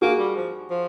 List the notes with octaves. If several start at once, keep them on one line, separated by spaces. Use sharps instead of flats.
A#3 F#4 G#4
G3
F3
F3